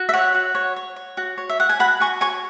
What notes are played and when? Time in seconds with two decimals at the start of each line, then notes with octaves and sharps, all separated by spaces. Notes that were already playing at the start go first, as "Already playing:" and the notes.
Already playing: F#4
0.09 E5
0.14 C#5 F#5
0.35 F#4
0.55 C#5
0.76 C#5
0.96 C#5
1.17 F#4
1.38 C#5
1.49 E5
1.59 C#5 F#5
1.69 G#5
1.79 F#4 F#5 B5
2.00 F#4 G#5 C#6
2.21 C#5 G#5 C#6